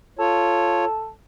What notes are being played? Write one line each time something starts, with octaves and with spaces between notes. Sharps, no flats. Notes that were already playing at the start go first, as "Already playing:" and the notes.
F4 A4 C#5